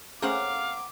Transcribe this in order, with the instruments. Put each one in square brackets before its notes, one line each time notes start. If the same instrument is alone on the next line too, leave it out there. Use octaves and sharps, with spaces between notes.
[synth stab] A3 C#4 G#4 [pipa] A#3 C4 F#5 [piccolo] F5 [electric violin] D6